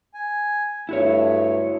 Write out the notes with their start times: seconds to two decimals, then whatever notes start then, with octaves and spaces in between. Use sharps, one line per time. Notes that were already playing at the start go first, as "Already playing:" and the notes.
0.14 G#5
0.89 G2 A3 E4 F#4 C#5